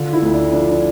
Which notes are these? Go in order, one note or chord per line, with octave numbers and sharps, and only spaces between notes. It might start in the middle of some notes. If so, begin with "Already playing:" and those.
Already playing: D3 F4
E4
D2
D4
F3 D4
D4